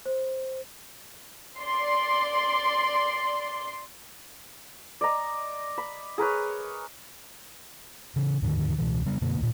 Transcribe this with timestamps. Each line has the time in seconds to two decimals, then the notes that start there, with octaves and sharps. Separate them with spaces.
0.06 C5
1.58 D5 C6
5.01 D5 D#5 A#5
5.78 B5
6.18 G#4 A#4 B4 C#5
8.16 C#3 E3
8.42 D#2 G#2 D3 D#3
8.78 C#2 B2 E3
9.06 C#3 G3 B3
9.21 F#2 B2 D3 A#3
9.40 D1 A1 A#2